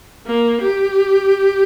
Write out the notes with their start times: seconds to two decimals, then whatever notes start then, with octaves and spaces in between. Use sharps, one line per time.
0.27 A#3
0.62 G4